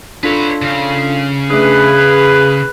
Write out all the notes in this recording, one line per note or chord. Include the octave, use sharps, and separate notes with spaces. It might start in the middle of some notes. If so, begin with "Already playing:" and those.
D4 F4 A4 B4 C#5
C#3
A3 D4 G#4 B4
G#6